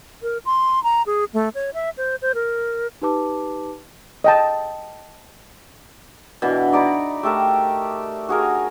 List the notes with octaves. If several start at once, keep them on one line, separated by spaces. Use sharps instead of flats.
A#4
C6
A#5
G#4
A3
C#5
E5
C5
C5
A#4
D#4 G4 B4 A5 D6
D#5 G5 A5
B2 E3 D4
D#4 D5 A#5 B5
A3 G4 A4 A#4
F#4 G#4 A#4